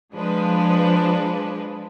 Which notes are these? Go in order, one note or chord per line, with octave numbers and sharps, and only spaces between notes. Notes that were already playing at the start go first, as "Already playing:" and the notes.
F3 G#3 D4 B4